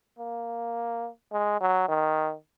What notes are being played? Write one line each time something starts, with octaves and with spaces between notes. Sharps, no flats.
A#3
G#3
F#3
D#3